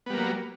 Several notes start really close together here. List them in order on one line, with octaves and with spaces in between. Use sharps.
B3 G3 A#3 F#3